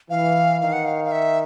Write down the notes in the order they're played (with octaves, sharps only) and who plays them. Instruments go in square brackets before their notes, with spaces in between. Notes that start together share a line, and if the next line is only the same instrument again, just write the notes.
[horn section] E3 [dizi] F5
[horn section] D#3 [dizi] F5
[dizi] F#5
F5
F5
E5